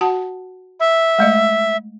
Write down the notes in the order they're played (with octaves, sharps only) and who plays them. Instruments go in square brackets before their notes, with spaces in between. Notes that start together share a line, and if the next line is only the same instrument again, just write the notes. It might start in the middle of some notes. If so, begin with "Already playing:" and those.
[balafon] F#4 F#5 A5
[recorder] E5
[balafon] G#3 A3 D#5